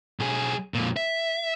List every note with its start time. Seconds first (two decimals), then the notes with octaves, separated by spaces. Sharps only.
0.20 B1 G#4
0.74 F2 A#2
0.97 E5